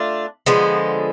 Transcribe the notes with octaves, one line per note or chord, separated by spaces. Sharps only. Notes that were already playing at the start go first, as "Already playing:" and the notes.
Already playing: A3 D4 F4
D3 F3 G#3 B3